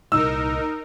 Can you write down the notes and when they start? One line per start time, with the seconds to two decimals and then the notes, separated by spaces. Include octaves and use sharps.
0.12 C2 A#2 D#4 A#4 E6